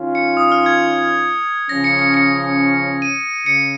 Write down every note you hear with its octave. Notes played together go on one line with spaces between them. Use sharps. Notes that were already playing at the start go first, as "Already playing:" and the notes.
Already playing: D#3 C#4 F4
C#7
D#6
F6
G#6
C#3 F3 C#4 A#6
C#7
C#7
C#7
D#7
C#3 C#7